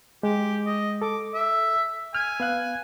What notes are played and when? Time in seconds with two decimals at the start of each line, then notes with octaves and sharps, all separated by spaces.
0.23 G#3 G4
0.66 D#5
1.02 A4 D6
1.34 E5
2.15 G#5 F6
2.40 B3 F5 F#6